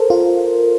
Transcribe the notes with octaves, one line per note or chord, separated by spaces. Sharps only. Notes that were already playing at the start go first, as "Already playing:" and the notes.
Already playing: A4 A#4 C5
F4